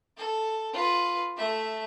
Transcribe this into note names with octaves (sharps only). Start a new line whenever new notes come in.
A4
F4 B4
A3 E5